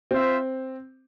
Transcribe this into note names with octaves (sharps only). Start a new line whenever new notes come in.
C4 F4 C5 E5